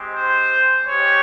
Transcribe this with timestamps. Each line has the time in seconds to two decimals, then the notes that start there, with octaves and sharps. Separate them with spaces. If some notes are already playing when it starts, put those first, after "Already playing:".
Already playing: G#3 C4 G4
0.15 C5
0.86 G#3 C#4 G4 C#5